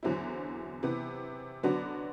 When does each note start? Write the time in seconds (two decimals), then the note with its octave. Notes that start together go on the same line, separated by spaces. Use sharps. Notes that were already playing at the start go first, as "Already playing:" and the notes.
0.03 E2 D3 F#3 C4 E4
0.83 C3 E3 B3
1.63 D3 F#3 B3 D4 F#4